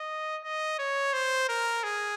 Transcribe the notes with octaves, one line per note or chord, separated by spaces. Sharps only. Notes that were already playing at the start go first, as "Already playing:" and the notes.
Already playing: D#5
D#5
C#5
C5
A#4
G#4